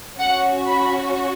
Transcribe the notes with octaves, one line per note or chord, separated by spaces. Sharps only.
C#4 F#4 F#5
B5